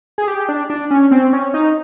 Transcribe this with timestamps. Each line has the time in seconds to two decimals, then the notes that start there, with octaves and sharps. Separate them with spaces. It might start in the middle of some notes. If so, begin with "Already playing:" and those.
0.18 G#4
0.28 G4
0.49 D4
0.70 D4
0.91 C#4
1.11 C4
1.33 C#4
1.54 D#4